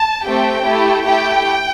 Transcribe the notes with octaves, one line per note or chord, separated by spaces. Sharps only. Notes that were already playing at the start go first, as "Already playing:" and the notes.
Already playing: A5
A3 C4 G4 G5
A3 E4 G4
A3 E4 G4 G5